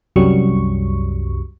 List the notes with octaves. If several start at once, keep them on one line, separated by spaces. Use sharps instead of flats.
C2 F#2 F#3 G3 C#6